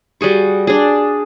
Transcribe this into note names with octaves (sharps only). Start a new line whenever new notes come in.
G3 F#4 G#4 C#6
D4 G#4